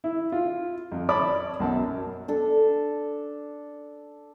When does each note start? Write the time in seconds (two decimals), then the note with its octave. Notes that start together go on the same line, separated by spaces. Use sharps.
0.04 E4
0.32 F4
0.92 F2
1.09 C#5 D5 A5 B5 D6
1.60 B1 F#2 F#3 A5
2.28 D4 A4